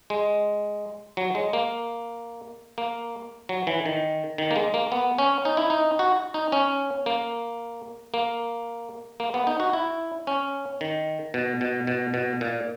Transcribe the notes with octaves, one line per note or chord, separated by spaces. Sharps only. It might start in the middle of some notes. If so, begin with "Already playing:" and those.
G#3
F#3
G#3
A#3
A#3
F#3
E3
D#3
D#3
A#3
G#3
A#3
B3
C#4
D#4
E4
D#4
F#4
D#4
C#4
A#3
A#3
A#3
B3
D#4
F#4
E4
C#4
D#3
B2
B2
B2
B2
A#2